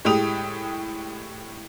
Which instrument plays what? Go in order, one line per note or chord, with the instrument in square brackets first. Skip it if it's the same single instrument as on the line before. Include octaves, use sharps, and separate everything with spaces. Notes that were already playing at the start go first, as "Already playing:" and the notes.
[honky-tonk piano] A2 G#3 G4 D#6 F7